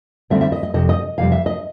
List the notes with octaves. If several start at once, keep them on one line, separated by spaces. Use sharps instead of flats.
D3 G3 C4 D#4 E5
E5
D#5
D#5
F2 C3 D#5
D#5
F2 C3 G3 F5
E5
D#5